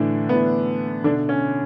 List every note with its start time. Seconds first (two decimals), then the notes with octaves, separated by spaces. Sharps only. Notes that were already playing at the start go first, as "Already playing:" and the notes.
Already playing: A2 D3 E3 D4
0.29 A2 E3 B3
1.04 B2 D3 D4
1.29 C#4